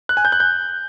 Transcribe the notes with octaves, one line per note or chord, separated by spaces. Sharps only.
F#6
G#5
G6
F#6
G6